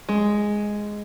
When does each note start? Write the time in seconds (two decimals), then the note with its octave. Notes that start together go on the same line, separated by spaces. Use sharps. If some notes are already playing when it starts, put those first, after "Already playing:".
0.09 G#3